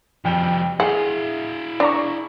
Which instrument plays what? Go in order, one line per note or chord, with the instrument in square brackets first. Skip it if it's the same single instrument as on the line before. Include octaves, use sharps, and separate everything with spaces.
[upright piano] F2 G5 [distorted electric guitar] F3 G3
[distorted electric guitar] E4 F5 [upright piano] G#4 [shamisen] F#5
[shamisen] D4 [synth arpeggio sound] D5 A#5 C#6